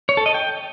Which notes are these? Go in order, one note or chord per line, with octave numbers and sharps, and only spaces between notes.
C#5
A4
D#5
G5